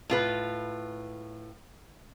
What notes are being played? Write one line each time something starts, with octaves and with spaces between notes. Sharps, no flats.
A2 F4 B4